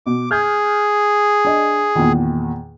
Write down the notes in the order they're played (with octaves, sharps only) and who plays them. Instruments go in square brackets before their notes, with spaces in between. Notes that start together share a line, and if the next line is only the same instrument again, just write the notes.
[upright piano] B2 [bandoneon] D6
[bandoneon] G#4 [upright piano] F6 G6 G#6
[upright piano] D4 D#5
E2 A#2 D#3